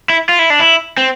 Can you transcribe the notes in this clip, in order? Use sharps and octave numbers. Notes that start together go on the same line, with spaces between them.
E4
F4
E4
D4
E4
C4